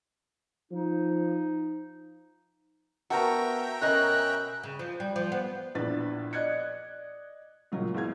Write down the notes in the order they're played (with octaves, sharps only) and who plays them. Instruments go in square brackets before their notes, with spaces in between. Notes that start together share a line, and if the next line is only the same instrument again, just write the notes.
[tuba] F3 [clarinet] D#4
[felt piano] B3 A#4 A5 [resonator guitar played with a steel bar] F#4 [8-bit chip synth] E5 G5 A#5
[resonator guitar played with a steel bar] B2 A#4 D#5 [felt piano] C#4 [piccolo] F#6
[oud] C#3
F3
G3
F3
B3
[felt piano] A#1 E2 D4 B4 A6
D5 D#5 F#6 G#6 C#7
C#2 A#2 F#3
E2 G#3 F5 G#6